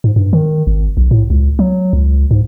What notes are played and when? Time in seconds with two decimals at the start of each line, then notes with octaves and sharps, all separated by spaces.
0.04 G#2
0.16 G2
0.33 D#3
0.67 G#1
0.97 B1
1.11 A2
1.30 C#2
1.59 F#3
1.93 C#2
2.31 G#2